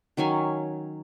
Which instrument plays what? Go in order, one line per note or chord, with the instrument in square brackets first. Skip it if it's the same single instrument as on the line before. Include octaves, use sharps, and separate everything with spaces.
[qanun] D#3 F#3 C#4 G#5